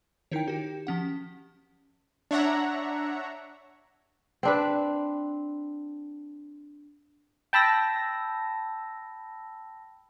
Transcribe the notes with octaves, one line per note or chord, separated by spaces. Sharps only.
D#3 D#4 E4 A#4 C#5 G5
D#4 F#4 G4
F3 C#4 F#5
D4 C#5 E5 F#5 A#5
C4 D4 B4
G5 A5 B5 E6 A#6